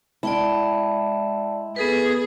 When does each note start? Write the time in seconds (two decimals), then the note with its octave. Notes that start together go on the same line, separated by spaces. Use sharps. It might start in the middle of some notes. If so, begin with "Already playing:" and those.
0.23 G#3 E4 D5 G5 A5
1.76 B3 G#4 A4 B4